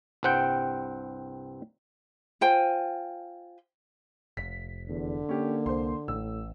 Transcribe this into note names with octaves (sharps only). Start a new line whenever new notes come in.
C2 G2 C4 F#5 G5
F4 C5 G5 G#5
F1 B6
E2 D3
A#3 C#4 G4
C2 C5 C6
A1 A2 E6